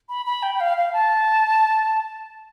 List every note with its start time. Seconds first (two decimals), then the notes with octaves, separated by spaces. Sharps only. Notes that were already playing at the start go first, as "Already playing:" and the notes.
0.09 B5
0.26 B5
0.43 G5
0.55 G5
0.60 F5
0.77 F5
0.93 A5